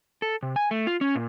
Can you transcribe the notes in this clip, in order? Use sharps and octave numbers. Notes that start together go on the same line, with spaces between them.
A4
C3
G#5
A3
F4
C#4
A#2